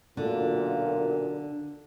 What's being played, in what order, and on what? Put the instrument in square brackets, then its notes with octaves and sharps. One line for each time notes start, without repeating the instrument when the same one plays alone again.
[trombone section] B1 F#2 A#2 [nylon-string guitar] D3